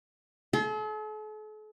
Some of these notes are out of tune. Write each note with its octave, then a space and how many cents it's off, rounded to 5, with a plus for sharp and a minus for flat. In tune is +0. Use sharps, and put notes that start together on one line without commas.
A4 -45 C6 +0